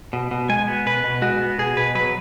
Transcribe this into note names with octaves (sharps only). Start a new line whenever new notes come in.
B2
B2
G#3 G#5
B3
B2 B4
B2
G#3 F#4
B3
B2 G#4
B2 B4
F#3 B4